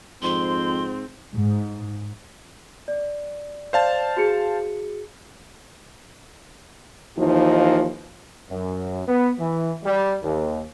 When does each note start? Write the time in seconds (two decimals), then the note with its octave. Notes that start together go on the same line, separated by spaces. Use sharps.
0.23 F2 G#2 C4 C6
1.32 G#2
2.88 D5
3.73 C5 D5 F5 A5
4.17 F#4 G#4 C#7
7.17 D#2 E3 F3 D#4 F4
8.50 F#2
9.07 B3
9.39 E3
9.84 G3
10.23 D#2